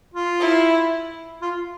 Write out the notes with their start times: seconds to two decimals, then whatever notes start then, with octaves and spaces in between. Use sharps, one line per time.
0.14 F4
0.40 E4
1.42 F4